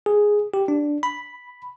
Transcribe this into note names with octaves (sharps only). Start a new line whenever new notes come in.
G#4
G4
D4
B5